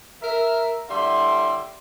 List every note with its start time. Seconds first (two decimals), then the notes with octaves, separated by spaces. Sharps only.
0.21 A#4 E5
0.89 A2 D3 G3 E5 C6